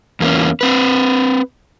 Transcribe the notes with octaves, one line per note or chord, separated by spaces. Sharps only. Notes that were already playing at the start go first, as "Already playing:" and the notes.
E2 A#3 C#4
C4 B4